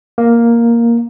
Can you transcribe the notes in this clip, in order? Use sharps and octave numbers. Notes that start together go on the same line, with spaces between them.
A#3